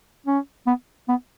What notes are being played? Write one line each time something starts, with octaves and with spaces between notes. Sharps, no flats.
C#4
B3
B3